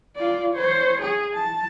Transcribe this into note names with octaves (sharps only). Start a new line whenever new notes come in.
F4 D5
C5 C#5
G#4
A5